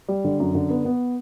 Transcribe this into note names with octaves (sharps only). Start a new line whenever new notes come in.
G3
D3
F#2
D3
B3
B3